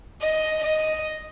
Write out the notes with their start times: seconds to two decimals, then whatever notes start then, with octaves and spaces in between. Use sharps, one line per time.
0.21 D#5
0.63 D#5